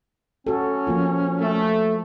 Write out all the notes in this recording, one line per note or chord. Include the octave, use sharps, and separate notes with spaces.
C#4 F#4 A4
F3 A#3 F4
A3